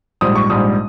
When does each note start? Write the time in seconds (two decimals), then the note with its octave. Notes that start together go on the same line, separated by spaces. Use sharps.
0.21 A#1 G#2 G3 D#6
0.36 C#6
0.50 A#1 G#2 G3 D#6